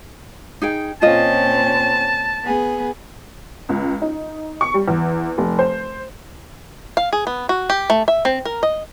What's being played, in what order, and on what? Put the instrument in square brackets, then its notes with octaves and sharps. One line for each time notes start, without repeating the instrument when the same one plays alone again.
[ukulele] D#4 G#4 G5
[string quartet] A#2 C4 C#4 [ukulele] F4 A4 D#5 [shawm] A5
[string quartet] B3 G#4
[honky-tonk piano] C#2
D#4
C#6
G3
E2
F1
C5
[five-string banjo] F5
G#4
B3
F#4
G4
A3
E5
C4
A#4
D#5